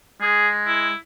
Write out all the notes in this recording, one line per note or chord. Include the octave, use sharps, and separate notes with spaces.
G#3 G#4
E4